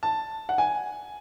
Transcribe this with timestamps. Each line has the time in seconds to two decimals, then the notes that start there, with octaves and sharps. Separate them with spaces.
0.03 A5
0.49 F#5
0.58 G#5